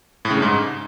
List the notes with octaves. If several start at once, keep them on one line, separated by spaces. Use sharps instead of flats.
A2
C#3
G2
G#2